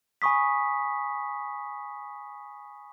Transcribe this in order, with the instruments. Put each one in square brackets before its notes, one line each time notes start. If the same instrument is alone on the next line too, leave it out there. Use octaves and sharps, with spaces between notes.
[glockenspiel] G#5 B5 C#6 D#6 B6